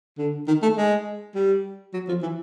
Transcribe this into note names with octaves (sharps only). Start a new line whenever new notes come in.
D3
D#3
A3
G#3
G3
F#3
F3
E3